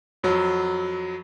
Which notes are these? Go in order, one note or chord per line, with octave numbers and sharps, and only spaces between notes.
F2 F#3